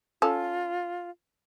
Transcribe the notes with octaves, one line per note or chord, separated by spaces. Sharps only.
C#4 F4 A4